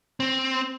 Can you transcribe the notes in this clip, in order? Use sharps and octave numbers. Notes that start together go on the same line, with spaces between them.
C4